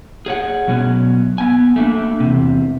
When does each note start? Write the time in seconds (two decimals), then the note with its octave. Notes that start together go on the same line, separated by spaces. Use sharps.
0.26 G#4 C#5 F#5
0.68 B2 F#3 B3 C#4
1.38 B3 G#5
1.76 A3 A#3 D4
2.20 E2 C3